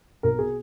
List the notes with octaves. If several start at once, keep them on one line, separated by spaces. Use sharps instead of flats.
B1 A#4
B2 G#4